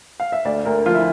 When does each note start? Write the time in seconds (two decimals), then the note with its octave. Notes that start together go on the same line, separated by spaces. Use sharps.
0.20 F5
0.32 E5
0.45 D2 D5
0.65 D2 A#4
0.86 F3 F4
0.94 E4